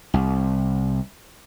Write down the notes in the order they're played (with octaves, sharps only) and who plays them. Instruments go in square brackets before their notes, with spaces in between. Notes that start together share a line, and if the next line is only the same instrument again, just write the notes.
[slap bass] C2